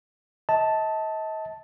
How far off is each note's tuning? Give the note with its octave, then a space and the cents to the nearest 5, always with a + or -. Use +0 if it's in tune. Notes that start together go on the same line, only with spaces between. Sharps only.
D#5 +40 A5 +0